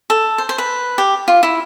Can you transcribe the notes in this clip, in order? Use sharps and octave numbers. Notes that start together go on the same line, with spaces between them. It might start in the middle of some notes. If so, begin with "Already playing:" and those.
A4
C5
C5
B4
G4
F4
E4